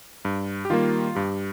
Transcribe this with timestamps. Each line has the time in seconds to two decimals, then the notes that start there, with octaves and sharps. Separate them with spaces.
0.25 G2
0.65 G4
0.70 D#3 G3 A#3 F4
1.15 G2 G4